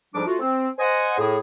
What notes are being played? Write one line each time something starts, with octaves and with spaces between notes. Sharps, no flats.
F2 G#2 F3 G3 D4 D6
A3 F4 F#4
C4
C5 D#5 F#5 G#5
A2 G#4